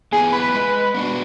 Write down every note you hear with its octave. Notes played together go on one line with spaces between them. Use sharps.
B3 E4 G4 G#4
B4
G#3
B3 D4 F#4